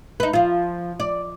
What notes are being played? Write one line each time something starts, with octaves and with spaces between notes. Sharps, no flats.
D#4 B4
F3 F4
D5